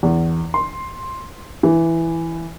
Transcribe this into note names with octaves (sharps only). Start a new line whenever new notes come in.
E2
C6
E3